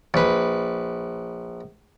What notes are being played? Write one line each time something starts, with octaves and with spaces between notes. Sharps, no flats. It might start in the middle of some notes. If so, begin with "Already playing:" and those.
A#1 B4